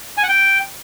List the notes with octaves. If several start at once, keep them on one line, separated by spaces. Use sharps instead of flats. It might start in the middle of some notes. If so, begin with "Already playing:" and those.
G#5
F#5
G5